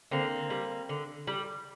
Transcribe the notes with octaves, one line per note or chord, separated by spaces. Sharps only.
D3 A#3 C4
G3
D3
G3